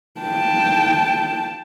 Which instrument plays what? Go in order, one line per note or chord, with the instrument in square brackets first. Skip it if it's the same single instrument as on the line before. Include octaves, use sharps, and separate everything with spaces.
[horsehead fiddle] G5 A5